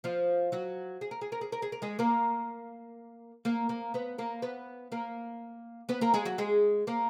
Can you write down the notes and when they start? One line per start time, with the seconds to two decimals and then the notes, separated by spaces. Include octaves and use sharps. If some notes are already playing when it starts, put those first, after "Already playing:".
0.04 F3 F4
0.52 F#3 F#4
1.01 G#4
1.11 A#4
1.21 G#4
1.32 A#4
1.41 G#4
1.52 A#4
1.62 G#4
1.72 A#4
1.82 G#3 G#4
1.99 A#3 A#4
3.45 A#3 A#4
3.69 A#3 A#4
3.94 B3 B4
4.18 A#3 A#4
4.42 B3 B4
4.92 A#3 A#4
5.89 B3 B4
6.01 A#3 A#4
6.14 G#3 G#4
6.26 F#3 F#4
6.38 G#3 G#4
6.87 A#3 A#4